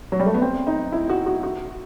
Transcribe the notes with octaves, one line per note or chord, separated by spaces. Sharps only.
F#3
G3
A3
B3
C4
D#4
E4
F#4
F#4
F#4